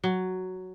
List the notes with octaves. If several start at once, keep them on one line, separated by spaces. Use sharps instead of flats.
F#3